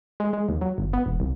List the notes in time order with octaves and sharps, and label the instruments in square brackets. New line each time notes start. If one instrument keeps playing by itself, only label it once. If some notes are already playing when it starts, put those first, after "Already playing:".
[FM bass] G#3
G#3
D#2
F#3
G1
B3
E1
C2